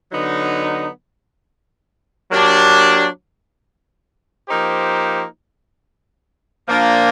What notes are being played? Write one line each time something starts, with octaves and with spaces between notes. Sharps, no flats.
D3 F#3 B3 D#4
F#3 A#3 D4 G4
F3 A#3 D#4 G4 C5
A#2 F3 A#3 D4